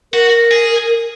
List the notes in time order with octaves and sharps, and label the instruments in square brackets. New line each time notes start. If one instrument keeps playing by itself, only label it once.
[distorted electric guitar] F#4 [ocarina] A#4
[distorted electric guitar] G#4